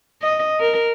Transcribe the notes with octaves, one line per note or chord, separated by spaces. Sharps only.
D#5
A#4